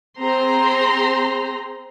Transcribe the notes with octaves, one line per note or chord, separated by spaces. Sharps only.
C4 G#4 C5 A#5 C6